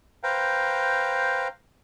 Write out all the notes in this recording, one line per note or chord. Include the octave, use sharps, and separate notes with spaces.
B4 C5 F5 G5 A#5